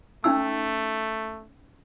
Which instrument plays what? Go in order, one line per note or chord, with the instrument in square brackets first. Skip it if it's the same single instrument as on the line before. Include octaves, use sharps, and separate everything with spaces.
[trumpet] A3 [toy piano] C#4 D#4 E6